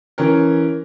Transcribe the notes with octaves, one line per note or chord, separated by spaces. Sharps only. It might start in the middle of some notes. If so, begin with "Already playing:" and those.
E3 C#4 A#4